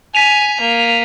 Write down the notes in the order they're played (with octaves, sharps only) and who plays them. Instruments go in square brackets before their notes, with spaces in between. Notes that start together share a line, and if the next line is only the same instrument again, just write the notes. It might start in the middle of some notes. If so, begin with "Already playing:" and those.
[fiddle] G#5 [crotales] B6 D#7 F7
[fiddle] A#3